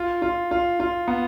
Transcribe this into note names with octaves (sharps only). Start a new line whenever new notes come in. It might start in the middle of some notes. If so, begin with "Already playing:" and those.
Already playing: F4
F4
F4
F4
B3